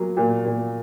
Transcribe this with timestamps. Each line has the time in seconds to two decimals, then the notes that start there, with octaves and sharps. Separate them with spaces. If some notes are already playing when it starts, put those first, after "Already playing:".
Already playing: A#2 F#3
0.17 A#2
0.45 A#2